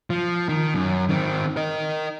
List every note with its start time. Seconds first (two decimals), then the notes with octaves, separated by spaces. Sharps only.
0.10 F3
0.49 D#3
0.75 F#2
1.09 D#3 C4
1.57 A#4 D#5